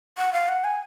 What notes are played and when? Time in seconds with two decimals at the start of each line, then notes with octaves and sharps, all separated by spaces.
0.18 F#5
0.33 F5
0.49 F#5
0.64 G#5